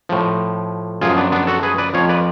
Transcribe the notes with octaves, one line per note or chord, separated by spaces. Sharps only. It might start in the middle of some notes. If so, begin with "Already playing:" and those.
A2 F3
F#2 F3 F4 G#4
B3 D4
B3 D4
F#4 A4
G#4 B4
B4 D5
F2 F3 C#5 F5
B4 D5